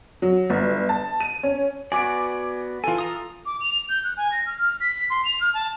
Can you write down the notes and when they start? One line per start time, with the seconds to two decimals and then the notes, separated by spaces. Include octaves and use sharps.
0.22 F#3
0.50 G1
0.89 A5
1.20 D#7
1.43 C#4
1.92 B3 F#4 D5 G#5 D6 D7
2.84 E3 F4 A4 G#5
2.98 A#5 D#6
3.46 D6
3.60 F7
3.89 G6
4.04 F#6
4.17 G#5
4.32 A#6
4.46 F6
4.81 B6
5.10 C6
5.25 F7
5.41 F6
5.54 A5